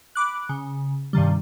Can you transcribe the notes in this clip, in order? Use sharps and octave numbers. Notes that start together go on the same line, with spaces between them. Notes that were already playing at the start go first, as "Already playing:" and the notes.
B5 D6 F#6
C#3
G2 C3 D#3 G3